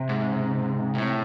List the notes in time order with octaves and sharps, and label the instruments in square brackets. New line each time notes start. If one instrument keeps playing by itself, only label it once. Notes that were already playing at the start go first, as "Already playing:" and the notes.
Already playing: [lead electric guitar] C3
[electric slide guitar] G#2
A2